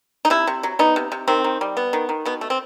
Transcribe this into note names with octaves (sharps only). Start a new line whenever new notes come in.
D#4
C3 E4
C3
F#3
B3 D#4
C3
C3
D#3 C4
D#3
G3
B3
D#3
D#3
B2 B3
A3
C4